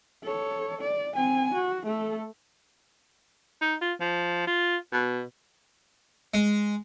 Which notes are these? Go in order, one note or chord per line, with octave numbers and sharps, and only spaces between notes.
A4 C#5
D5
C4 G#5
F#4
A3 A4
D#4
F4
F3
F4
B2
G#3